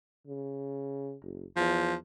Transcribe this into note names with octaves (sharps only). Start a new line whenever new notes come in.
C#3
F#1
E2 F3